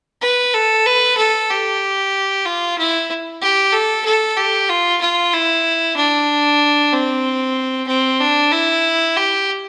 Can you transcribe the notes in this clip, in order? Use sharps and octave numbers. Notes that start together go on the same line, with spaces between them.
B4
A4
B4
A4
G4
F4
E4
G4
A4
A4
G4
F4
F4
E4
D4
C4
C4
D4
E4
G4